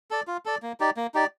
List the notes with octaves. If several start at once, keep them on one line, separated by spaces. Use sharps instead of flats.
A4 D5
F4
A4 D5
A#3
D#4 G4 D5
A#3
D#4 G4 D5